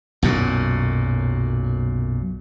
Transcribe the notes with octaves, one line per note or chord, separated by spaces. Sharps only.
B1 F#2 A#2